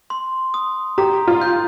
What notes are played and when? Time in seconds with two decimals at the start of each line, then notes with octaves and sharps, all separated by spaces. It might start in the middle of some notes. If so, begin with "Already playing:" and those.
0.10 C6
0.54 D#6
0.98 G4 A#5
1.28 F4
1.41 G6